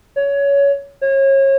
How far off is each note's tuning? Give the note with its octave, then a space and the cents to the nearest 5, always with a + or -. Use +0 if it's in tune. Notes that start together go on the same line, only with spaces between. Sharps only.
C#5 +20
C#5 -30